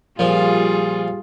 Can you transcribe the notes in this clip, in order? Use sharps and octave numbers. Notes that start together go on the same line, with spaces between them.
A#2 F3 G3 F4 G#4